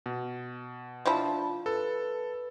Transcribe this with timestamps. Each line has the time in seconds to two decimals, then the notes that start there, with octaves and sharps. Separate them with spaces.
0.06 B2
1.06 F3 D4 E4 F4 A5
1.66 A4 B4